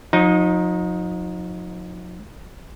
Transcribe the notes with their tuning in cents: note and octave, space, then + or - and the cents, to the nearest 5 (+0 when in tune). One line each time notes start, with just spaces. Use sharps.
F3 +45 D#4 +0